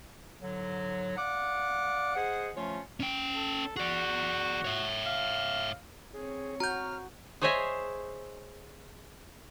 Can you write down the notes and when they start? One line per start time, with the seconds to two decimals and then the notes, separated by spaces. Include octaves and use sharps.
0.42 G#2 D3 F#3
1.17 D5 F5 F#5 D6
2.15 G#4 C5 D#5 F#5
2.56 F3 A3 C#4 F4 C#5
3.00 C#4 G5
3.35 A4
3.76 F#4 G#4 D5
4.65 C#5 E5
5.06 F5
6.13 C4 G#4 C#5
6.60 F#4 A#5 F6 G6
7.42 G#4 C5 C#5 D#5 E5 G#5